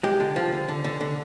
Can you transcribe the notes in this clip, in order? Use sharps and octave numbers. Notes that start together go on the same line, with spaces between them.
G#3 G4
D3
F3
D3
D3
D3
D3